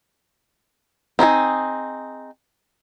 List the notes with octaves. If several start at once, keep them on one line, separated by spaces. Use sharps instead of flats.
C4 D#4 E4 G#4